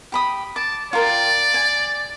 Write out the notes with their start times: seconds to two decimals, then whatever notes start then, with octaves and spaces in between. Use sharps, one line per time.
0.12 G4 B5 D#6
0.56 A5 D6
0.93 F4 A#4 D5 G5
1.54 G#5